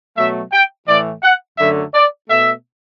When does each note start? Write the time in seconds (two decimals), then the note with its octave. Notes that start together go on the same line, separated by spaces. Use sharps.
0.17 B2 F#3 A3 E5
0.53 G5
0.87 A2 E3 A3 D5
1.23 F#5
1.58 F#2 D3 F#3 A3 E5
1.94 D5
2.28 B2 A3 E5